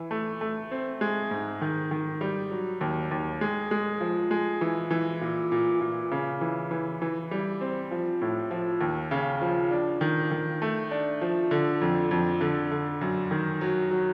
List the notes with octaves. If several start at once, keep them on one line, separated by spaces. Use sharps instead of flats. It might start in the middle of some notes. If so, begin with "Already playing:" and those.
Already playing: E3
A3
A3
C4
G#3
G#2
D#3
D#3
G3
F#3
D#2
D#2
G#3
G#3
F3
G#3
E3
E3
A#2
A#2
A#2
C#3
E3
E3
E3
G3
C4
F3
A2
F3
D#2
C#3
F3
D4
D#3
D#3
A3
D4
F3
D3
F2
F2
D3
D3
F#2
D#3
F#3
F#3